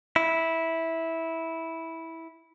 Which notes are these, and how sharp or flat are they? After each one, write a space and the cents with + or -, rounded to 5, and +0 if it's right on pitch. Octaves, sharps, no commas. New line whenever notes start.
E4 -10